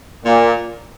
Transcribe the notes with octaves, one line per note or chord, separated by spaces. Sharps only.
A#2